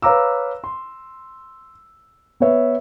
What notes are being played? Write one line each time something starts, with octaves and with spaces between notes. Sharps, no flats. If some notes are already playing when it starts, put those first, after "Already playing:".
B4 C#5 F5 A#5 D6 E6
C6
B3 B4 C#5 E5